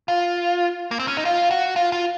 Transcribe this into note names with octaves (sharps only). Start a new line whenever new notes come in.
F4
A#3
C4
C#4
D#4
F4
F#4
F4
F4